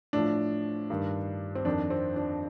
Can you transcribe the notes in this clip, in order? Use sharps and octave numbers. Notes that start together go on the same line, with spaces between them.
A2 F3 D4
G2 D#3
C4
F2 D#3 D4
C4
D4